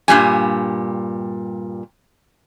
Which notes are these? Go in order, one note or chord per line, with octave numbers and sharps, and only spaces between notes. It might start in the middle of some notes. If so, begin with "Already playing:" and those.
G2 A#2 G3 G#5